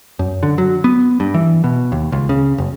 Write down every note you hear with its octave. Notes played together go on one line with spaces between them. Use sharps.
F#2
D3
F#3
B3
G2
E3
B2
D#2
C#2
C#3
F#1